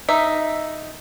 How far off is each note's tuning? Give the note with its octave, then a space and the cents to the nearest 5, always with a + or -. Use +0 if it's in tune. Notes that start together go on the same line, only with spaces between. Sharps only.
D#4 +0 E5 +0